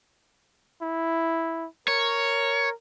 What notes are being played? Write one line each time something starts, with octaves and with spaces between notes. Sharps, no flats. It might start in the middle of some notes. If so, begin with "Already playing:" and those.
E4
A#4 C#5